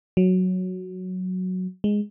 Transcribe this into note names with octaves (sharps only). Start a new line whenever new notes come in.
F#3
G#3